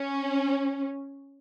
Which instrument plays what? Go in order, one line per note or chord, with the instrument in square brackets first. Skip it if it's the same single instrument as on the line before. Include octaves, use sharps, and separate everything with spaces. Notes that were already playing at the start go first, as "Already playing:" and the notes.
Already playing: [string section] C#4